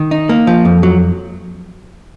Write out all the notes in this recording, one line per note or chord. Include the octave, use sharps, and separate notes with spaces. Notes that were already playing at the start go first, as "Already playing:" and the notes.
Already playing: D#3
D#4
A#3
F3
F2
F#3